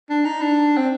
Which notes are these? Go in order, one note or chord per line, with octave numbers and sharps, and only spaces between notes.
D4
D#4
D4
C4